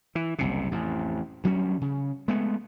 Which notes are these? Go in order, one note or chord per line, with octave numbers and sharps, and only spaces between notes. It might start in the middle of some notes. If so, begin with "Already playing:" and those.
E3
F#1 C2 C3
A1 F2
D2 F#3 G3 C#4
C#3
G#3 A3 B3